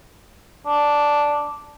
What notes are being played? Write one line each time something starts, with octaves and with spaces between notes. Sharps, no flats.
D4